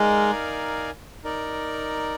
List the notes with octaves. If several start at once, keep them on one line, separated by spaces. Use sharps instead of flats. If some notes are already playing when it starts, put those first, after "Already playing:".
Already playing: G#3 D#4 A#4 D5 F5 G#5
D#4 A#4 D5